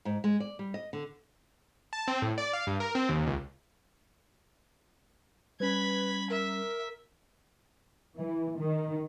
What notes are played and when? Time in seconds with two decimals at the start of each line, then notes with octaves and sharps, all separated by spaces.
0.05 G#2
0.24 G#3
0.40 D5
0.59 G3
0.74 D#5
0.93 D3
1.93 A5
2.08 C4
2.22 A2
2.38 D5
2.53 F5
2.67 G2
2.80 A#4
2.95 C4
3.09 D#2
3.27 C#2
5.60 G3 C#4 B4 B5 G#6
6.30 A#4 E5
8.16 E3
8.58 D#3